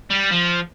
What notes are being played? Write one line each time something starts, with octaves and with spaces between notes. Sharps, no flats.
G3
F3